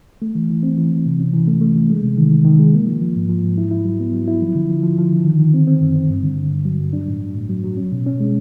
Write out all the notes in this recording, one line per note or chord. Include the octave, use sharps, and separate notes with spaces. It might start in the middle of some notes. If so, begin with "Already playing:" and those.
A3
E3
E3
C4
E3
E3
C3
C#4
E3
A3
A3
E3
G#3
C3
D#3
D#3
D#3
G#3
A#3
F3
F3
G#2
F3
G#2
E4
E4
F#3
B3
F#3
E4
F3
D3
F3
F3
F3
D3
D#3
D#3
C4
C4
F#2
C4
G2
D3
D3
G2
F#3
G2
D4
A2
F#3
A2
F#3
F#3
C#4
B2
C#4
G#3